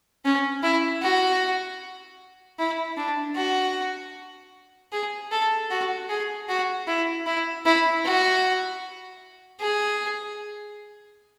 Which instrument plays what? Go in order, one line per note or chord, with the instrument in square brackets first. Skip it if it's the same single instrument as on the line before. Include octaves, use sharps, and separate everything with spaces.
[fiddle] C#4
E4
F#4
E4
D4
F#4
G#4
A4
F#4
G#4
F#4
E4
E4
E4
F#4
G#4